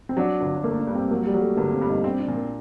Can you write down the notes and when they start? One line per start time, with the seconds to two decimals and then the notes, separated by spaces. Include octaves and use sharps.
0.09 C4
0.17 F#3 D4
0.41 G1
0.64 A3 A#3
0.79 D4
0.87 G2
0.95 C4
1.11 F#3 A#3
1.27 G3
1.34 F#3
1.41 A3
1.57 G1 A#3
1.72 C4
1.81 G2
1.89 D#4
2.04 C4 D4
2.20 D4
2.28 A#2
2.35 A#3